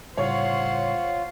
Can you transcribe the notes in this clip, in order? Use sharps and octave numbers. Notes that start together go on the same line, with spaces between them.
A2 C#3 G3 F4 C5 C#5 F#5